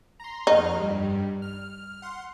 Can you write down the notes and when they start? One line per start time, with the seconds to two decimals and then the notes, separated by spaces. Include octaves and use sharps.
0.20 A#5 C6
0.47 F2 D#4 F6
0.76 G2 G3
1.42 F6
2.02 F#5 C6